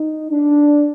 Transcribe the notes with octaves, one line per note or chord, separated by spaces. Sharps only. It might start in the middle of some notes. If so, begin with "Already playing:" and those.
Already playing: D#4
D4